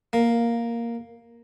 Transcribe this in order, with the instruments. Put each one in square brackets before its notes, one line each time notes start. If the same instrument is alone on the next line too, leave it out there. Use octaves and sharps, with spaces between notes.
[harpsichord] A#3